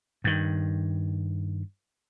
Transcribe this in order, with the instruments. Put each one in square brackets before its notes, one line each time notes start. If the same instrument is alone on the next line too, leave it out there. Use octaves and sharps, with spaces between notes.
[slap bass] G2 D#3